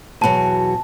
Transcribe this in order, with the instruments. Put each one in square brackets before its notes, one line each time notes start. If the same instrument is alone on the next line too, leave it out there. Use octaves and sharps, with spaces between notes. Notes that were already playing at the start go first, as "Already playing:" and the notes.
[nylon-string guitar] E2 B2 F#3 [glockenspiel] A5